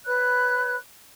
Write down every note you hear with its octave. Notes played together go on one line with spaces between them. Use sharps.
B4 C#5 B5 F#6